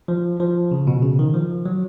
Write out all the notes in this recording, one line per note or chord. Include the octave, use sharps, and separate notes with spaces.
F3
F3
C#3
B2
C#3
D#3
F3
F#3